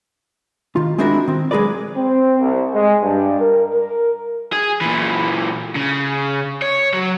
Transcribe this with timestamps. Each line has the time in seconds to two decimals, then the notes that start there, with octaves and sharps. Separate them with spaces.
0.76 D#3 F4
0.98 G#3 C4 D4 E4 F#4 A#4
1.28 D#3 C4
1.51 F#3 G#3 G#4 A#4 B4 D5
1.96 C4
2.40 C2
2.74 G#3
3.02 G2
3.40 A#4
3.74 A#4
4.53 G#4
4.81 A#2 E3
5.75 C#3
6.62 C#5
6.94 F#3